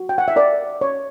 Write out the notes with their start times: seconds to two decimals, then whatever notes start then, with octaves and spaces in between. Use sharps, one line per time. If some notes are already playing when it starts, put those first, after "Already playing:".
Already playing: F#4
0.09 G5
0.18 F#5
0.28 E5
0.36 A#4 D5
0.81 C#5